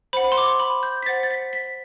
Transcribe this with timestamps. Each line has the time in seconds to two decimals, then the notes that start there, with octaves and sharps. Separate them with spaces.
0.13 C5 F#5 B5
0.32 C6
0.38 D6
0.60 B5
0.83 G6
1.03 B6
1.06 C5 F#5 A6
1.23 A6
1.30 B6
1.53 B6